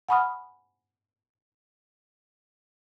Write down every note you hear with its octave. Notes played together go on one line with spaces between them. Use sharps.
F#5 G#5 B5 C#6 D#6 F6